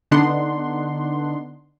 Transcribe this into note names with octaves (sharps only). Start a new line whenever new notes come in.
D3 B3 D4 D#4 F#5 C6